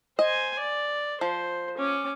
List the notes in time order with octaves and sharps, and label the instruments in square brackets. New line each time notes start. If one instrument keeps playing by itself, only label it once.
[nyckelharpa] C5 G#5 [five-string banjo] D#5
[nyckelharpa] D5
[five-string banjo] F3 [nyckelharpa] C5
[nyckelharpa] C#4 D6